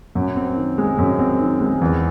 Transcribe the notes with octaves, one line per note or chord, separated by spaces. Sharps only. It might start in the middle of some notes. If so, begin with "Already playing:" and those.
F#2
C4
D#3
G#3
F#2
C4
D#3
G#3
E2